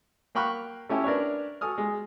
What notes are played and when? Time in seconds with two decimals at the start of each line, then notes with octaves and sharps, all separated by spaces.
0.35 A#3 G5 B5 C#6 F6 F#6
0.89 A3 C#4 E4 G4
1.04 D4 A#4 B4 C#5
1.61 F#4 A4 G#5 D#6 F6
1.78 G#3